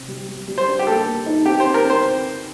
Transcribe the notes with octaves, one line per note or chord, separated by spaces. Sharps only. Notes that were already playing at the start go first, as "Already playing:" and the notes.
Already playing: C3 C4
G3
G3
G3
C5
D4
G4
A#3 A4
A#3
D#4
C4 G4
C4 C5
A#4
C4
C5